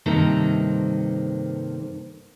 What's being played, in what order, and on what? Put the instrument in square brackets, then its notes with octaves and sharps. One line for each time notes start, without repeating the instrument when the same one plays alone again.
[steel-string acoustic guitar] G2 C3 D#3 A#3 A4 A#5